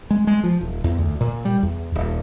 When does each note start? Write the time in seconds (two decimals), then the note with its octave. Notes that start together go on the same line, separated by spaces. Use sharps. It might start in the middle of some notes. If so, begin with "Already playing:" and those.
0.10 G#3
0.27 G#3
0.44 F3
0.61 D#1
0.84 E2
0.98 D2
1.21 A#2
1.45 G3
1.63 E2
1.95 D#1